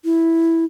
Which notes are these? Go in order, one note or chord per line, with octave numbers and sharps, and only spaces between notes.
E4